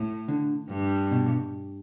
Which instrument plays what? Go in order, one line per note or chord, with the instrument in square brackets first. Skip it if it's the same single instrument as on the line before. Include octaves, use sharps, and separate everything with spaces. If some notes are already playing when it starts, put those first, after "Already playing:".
Already playing: [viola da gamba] A2
[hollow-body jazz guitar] D3
[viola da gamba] G2
[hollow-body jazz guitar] B2